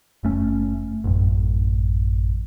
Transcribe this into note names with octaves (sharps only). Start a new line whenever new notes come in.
F#1 A3 C#4
A1 F#2